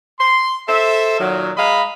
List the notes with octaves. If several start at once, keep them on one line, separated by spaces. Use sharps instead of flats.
C6
A4 C5 E5
A#2 D#3 F#3
G#3 D#5 F5 A#5 B5